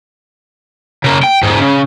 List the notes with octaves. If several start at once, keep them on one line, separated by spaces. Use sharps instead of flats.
C#3 A#3
G5
E2 G#2
C#3